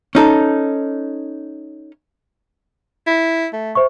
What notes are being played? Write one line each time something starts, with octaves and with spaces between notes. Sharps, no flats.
C#4 D#4 A4
E4
A3
C5 E5 C#6